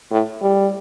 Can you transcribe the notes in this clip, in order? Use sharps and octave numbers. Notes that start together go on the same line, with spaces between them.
A2
G3